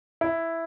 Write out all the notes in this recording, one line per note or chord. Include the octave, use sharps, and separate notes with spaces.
E4